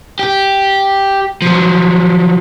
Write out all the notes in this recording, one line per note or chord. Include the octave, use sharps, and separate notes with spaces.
G4
F3 F#3